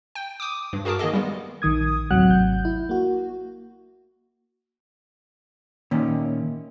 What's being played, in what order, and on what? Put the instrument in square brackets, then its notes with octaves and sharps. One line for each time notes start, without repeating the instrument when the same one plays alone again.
[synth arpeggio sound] G5
D6 D#6
G2
F#4 G#4 A#4 A5 D6
D#3 A#3 G#4 D#5
G3 G#3 B3
[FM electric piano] A#1 D#3 D#6 G#6
D2 A2 C3 F#3 F#5 F#6
G#1 G6
E4
A#3 F#4
[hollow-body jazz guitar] A#2 D#3 C#4 [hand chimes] A#3